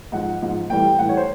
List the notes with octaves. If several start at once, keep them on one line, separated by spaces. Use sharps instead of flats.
G#2 F3 F#5
G#2 F3
A2 E3 G3 G5
A2 E3 G3 F#5
C#5
C5